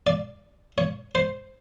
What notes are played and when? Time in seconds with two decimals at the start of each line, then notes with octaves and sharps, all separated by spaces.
0.07 D5
0.78 C#5
1.15 C5